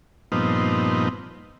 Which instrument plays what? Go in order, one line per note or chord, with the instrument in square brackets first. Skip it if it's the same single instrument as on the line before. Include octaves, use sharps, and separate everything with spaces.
[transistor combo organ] G2 A#2 F3 B3 C4 D#4